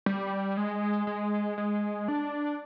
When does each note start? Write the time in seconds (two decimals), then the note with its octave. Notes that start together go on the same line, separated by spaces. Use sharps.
0.06 G3
0.57 G#3
1.07 G#3
1.58 G#3
2.08 D4